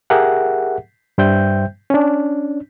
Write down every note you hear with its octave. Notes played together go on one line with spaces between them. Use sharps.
G4 G#4 A#4 E5 F#5
G2 G3 C5 E5 G5 G6
C#4 D4